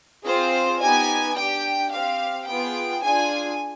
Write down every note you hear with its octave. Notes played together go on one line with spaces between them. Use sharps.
C4 F4 G#4 C5
B3 D#4 G4 G#5
D4 G4 G5
C4 G4 F5
B3 F4 G#4 G5
D4 F4 G#4 G#5